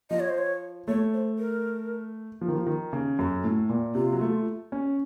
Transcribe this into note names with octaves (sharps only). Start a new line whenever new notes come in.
F3 D#5
C#5
C5
C#5
A3 C#5
C5
A#4
F3
D#3
F3
D#3
C#3
F#2 A4
A2
A#2
C3 F4
F#3
A3
C#4